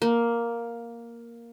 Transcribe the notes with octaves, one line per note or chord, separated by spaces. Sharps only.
A#3